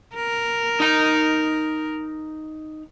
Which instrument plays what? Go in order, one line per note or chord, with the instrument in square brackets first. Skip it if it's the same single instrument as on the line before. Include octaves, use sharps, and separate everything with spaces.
[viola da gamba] A#4
[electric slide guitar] D#4 A#5